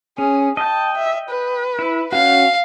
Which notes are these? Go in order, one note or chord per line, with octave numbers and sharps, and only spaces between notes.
C#4 G#4
D#5 G5 A5
E5
B4
E4
C#4 F#4 F5